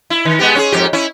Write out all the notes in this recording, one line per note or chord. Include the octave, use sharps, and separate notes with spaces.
E4
D#3
G#3 B3 G4
C#4 G4 G#4
F2 G#2 G4
C#4 E4